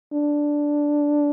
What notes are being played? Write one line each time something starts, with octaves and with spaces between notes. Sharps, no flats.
D4